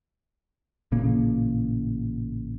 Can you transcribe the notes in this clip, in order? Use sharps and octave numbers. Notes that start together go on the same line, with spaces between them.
A1 A#2 C#3 A#3